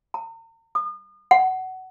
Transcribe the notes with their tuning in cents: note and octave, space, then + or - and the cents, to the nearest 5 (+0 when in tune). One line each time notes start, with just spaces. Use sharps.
A#5 -40
D#6 -40
F#5 +20